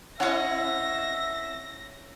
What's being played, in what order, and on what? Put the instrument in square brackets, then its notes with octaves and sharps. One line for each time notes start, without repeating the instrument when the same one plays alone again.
[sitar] C4 E4 D#5 [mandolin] C#4 F#5 [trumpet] E5 [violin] A#6